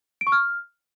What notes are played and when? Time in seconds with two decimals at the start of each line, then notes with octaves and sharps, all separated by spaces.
0.21 D7
0.27 C#6
0.32 F6